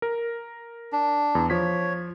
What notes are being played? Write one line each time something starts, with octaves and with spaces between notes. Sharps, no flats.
A#4
D4
E2
F3 C#5 B6